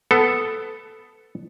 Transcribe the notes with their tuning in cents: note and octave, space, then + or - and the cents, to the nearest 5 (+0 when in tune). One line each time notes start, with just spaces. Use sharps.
B3 +10 A4 +0